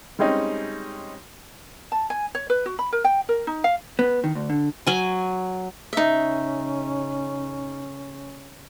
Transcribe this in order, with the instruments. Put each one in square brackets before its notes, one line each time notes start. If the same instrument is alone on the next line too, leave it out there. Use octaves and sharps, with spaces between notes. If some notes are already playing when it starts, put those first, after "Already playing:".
[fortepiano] G3 G#3 C4 C#4 D#4
[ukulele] A5
G#5
C#5
B4
F#4
B5
A#4
G5
A#4
D#4
F5
[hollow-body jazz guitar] B3
D#3
D2
D3
[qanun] F#3 G#5
[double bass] C#3 C#4 [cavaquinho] D#4 E5